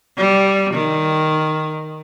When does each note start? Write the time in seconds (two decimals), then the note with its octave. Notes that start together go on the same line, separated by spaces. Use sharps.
0.18 G3
0.73 D#3